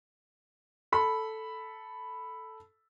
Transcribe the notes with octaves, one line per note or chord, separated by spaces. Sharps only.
A4 B5